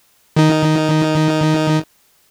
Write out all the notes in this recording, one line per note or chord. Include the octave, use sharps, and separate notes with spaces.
D#3 D#4